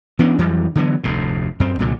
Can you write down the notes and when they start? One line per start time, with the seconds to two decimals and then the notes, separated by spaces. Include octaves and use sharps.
0.19 E3 B3 C#4 D4
0.38 F2 E3 F#3 G3
0.75 D3 E3 F#3 B3
1.04 F1 D2 A2
1.60 F#2 C4
1.79 C2 A#2 D3 F#3